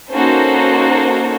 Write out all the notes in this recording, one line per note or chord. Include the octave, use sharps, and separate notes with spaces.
A#3 C#4 D#4 F#4 A4 C5